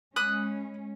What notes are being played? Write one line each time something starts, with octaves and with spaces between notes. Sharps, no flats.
G#3 C#4 B5 D#6 F#6